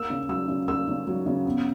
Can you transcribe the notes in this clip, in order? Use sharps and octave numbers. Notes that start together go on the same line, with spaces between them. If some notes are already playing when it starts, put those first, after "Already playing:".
Already playing: A#3 E6
C#3
F#3 E6
C#3
A#3 E6
C#3
F#3
C#3
B3